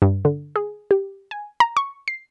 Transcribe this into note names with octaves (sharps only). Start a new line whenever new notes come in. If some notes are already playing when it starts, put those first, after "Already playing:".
G2
D3
G#4
G4
G#5
A#5
C#6
C7